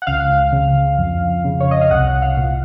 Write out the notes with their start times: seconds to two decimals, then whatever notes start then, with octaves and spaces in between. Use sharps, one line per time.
0.02 F#5
0.07 C#2 F5
0.52 C#3
0.99 F2
1.44 C#3
1.60 C#5
1.71 D#5
1.81 F5
1.91 C2 F#5
2.22 F5
2.37 A#2